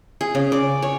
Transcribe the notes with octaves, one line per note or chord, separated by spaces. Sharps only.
G#4
C#3
D5
C#5